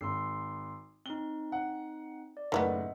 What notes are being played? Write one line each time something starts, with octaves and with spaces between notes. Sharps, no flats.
G#1 C6 E6 C7
C4 D#4 G7
F#5
D5
F#1 A2 D#3 G#3 B3 D#5 E5 F#5